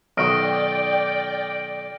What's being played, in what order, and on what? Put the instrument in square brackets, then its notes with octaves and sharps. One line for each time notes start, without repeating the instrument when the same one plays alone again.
[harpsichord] B1 D#3 F#4 [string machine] D5 G5 [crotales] F6 A#6 D7